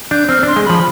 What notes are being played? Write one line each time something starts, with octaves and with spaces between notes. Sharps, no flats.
D4 G6
C4 F6
D4 C6
G#3
F3 B5